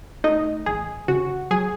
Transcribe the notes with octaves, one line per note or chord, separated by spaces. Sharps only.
A3 D#4 D#5
A1 G#4
C#3 F#4
F#3 G#4